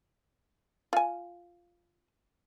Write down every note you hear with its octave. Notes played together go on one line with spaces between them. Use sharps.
F4 G#5